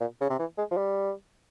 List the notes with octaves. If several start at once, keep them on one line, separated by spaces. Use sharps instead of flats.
A#2
C#3
C3
E3
G#3
F3
G3